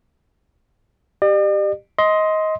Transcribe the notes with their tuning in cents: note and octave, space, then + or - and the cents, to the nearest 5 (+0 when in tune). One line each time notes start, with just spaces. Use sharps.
G4 +0 D5 +45
D#5 +20 C6 +0